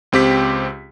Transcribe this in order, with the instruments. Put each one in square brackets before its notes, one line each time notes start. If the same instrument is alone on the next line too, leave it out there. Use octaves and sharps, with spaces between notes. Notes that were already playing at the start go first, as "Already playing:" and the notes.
[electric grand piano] C#2 C4 G4 B6